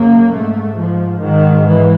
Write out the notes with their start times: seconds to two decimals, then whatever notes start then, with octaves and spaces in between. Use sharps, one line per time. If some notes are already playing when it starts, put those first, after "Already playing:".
Already playing: F#2 C#3 A#3
0.32 G#2 A3
0.77 F3
1.21 G#2 D#3
1.66 E3